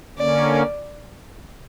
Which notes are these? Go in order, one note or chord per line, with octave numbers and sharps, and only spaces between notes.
D3 A#3 C#4 D5